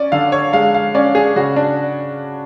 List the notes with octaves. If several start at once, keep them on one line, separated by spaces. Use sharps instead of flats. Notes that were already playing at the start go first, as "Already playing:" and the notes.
Already playing: C#4 D5
D3 F5
C#5
G#3 F5
F5
C#4 D5
G#4
C#3 F#4
D4